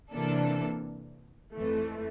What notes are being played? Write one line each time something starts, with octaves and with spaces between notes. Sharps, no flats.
C3 E3 A#3 D4 A4
F2 E3 A3